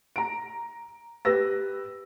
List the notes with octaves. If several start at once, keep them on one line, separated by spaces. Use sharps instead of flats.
A#5 D7
G4 B4 E6 A#6